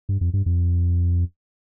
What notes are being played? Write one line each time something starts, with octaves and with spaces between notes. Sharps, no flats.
G2
F2
G2
F2